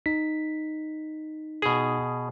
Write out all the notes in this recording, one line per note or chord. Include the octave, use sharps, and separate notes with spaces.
D#4 B6
B2 G#4